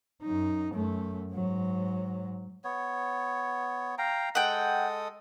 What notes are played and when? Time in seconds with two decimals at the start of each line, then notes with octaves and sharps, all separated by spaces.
0.23 F#2 D#4
0.72 F#2 A3
1.32 G#2 F#3
2.64 B3 C#5
3.98 F5 G5 A#5
4.35 G#3 A4 F#5 G5 D#6